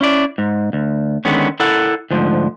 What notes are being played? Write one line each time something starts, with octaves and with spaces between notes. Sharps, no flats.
C#4 E4 D5
G#2
D2
D3 D#3 G#3 B3 C#4
E4 A4 A#4 F#5
D2 G#2 F3